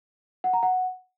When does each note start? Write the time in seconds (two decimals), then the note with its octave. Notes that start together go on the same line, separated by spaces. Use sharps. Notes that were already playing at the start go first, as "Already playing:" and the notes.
0.44 F#5
0.53 A#5
0.63 F#5